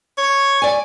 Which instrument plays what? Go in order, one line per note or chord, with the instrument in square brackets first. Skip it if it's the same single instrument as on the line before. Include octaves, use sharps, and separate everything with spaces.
[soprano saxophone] C#5
[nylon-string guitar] D5 G#5